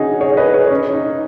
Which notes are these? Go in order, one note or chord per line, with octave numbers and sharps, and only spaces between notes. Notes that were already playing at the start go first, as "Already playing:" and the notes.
Already playing: C#4 D#4 F#4 G#4
G#4 C#5
B4 D#5
G#4 C#5
C#4
D#4